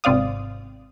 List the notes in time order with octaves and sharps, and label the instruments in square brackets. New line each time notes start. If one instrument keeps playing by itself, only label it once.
[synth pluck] G#1 C3 C4 D5 F5 D#6